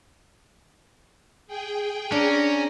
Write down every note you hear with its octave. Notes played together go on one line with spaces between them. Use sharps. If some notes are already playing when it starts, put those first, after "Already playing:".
G#4 G5
C#4 D4 A#5